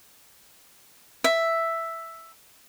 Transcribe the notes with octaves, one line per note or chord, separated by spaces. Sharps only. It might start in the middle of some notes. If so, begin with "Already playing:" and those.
E5